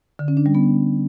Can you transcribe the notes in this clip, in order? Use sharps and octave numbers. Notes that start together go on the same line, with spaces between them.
D3
C#4
D4
G3
B3